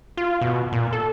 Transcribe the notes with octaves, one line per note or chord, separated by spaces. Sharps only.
F4
B2
A#2
A4